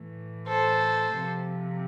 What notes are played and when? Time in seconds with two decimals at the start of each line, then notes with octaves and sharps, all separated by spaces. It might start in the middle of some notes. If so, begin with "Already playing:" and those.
Already playing: A2 E3
0.48 A4 C5
1.13 C3 F3